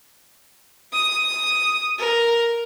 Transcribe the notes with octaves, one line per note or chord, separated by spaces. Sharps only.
D#6
A#4